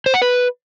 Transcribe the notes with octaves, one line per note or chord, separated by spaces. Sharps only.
C5
F#5
B4